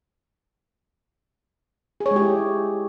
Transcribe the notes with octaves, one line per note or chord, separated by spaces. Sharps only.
G#4
C#5
G#3
G4
E4